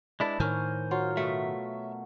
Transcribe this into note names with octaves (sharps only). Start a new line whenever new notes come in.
G#3 D4 E4 B4 D5
A2 D#3 A#4 C5 C#5 G#5 F6
F#3 F4
B2 A3 E5